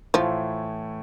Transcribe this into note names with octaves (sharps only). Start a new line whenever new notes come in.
A2 E3 F3 A3 F4